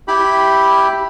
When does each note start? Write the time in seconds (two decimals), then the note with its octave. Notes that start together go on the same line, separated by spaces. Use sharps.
0.08 E4 G4 B5